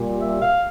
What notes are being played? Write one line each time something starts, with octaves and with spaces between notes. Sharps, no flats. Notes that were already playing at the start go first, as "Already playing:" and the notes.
Already playing: A#2 G3
E5
F5